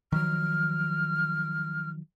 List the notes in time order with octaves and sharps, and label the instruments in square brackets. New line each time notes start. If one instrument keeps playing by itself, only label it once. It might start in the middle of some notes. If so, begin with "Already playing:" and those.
[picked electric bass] D#3 F3 F#3 [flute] F6